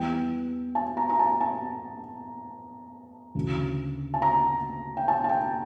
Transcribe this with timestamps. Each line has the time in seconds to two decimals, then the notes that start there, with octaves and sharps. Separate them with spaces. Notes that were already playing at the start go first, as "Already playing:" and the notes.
Already playing: E2 E3 G3 G5
0.75 A5
0.97 A#5
1.10 A#5
1.19 A5
1.41 A5
3.35 D2 C#3 E3
4.14 A5
4.22 A#5
4.97 G5
5.08 A5
5.24 A5
5.29 G5